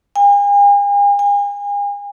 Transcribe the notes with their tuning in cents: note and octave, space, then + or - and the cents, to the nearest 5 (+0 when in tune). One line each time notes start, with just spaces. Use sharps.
G#5 -45
G#5 -40